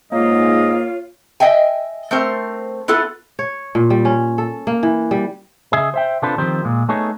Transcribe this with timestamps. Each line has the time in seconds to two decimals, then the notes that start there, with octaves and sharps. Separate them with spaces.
0.12 G#2 A#3 F4 C#5 D#5 F5
1.40 D#5 E5 G5 G#5
2.11 A3 C4 A#4 C5
2.88 B3 E4 F4 A4 B4
3.39 C#5
3.75 A#2
3.90 G3
4.05 C#4
4.38 A4
4.67 A#3
4.83 E3
5.11 G3
5.73 C#3 G#4 D#5 E5
5.94 C5 E5 G5
6.22 C3 D4 F4 A4 B4 C5
6.38 D#3 F3 C4 G4 A#4 C5
6.64 A#2 G#3
6.89 A3 B3 D#4 G#4 A4 C#5